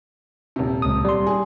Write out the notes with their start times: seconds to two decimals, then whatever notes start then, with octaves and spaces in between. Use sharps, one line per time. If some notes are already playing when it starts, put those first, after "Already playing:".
0.56 D#1 C3
0.82 C#2 D#6
1.05 G3 C6
1.27 G#4